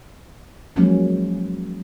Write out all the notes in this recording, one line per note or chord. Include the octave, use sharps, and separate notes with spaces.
F3 F#3 G#3 A#3 C#4